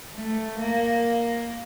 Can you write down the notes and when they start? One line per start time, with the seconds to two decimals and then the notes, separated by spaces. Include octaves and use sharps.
0.15 A3
0.59 A#3